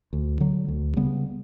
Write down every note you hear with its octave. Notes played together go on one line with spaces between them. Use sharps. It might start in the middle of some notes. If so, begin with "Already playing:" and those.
D2
D3 F#3
D2
C#3 G3 B3